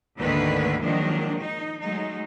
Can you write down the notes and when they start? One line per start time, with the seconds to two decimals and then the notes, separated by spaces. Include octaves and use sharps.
0.18 D2 G#2 D3 D#3 A#3 B4
0.83 A#2 D#3 F3 F#3 G#3 D4
1.42 D#4
1.82 F#3 G#3 A3 D#4